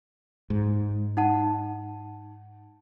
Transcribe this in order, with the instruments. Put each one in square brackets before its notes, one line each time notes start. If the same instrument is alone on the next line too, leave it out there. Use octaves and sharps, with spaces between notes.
[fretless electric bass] G#2
[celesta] D#4 F#5 A5